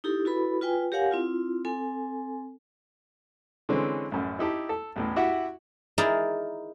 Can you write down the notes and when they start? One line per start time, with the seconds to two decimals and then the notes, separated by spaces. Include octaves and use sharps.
0.04 D#4 E4 G4 A4
0.25 E4 F#4 A4 B4 B5
0.61 F4 B4 G5 G#5
0.92 G4 A#4 C#5 F5 F#5 G#5
1.11 C4 E4 F4
1.65 C4 A4 G#5
3.69 D3 E3 G#3 C4 C#4
4.12 A1 F#2
4.39 D#4 E4 G4 A5
4.69 A4
4.96 A1 E2 A2
5.16 E4 F#4 G4 E5 F#5
5.98 D#4 E4 G#4 A#4 D5